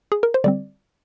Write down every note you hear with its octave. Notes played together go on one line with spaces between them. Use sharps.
G#4
A#4
C5
D3 G3 C4 D5